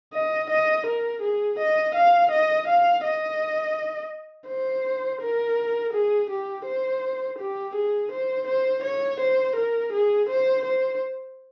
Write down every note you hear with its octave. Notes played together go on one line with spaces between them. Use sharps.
D#5
D#5
A#4
G#4
D#5
F5
D#5
F5
D#5
C5
A#4
G#4
G4
C5
G4
G#4
C5
C5
C#5
C5
A#4
G#4
C5
C5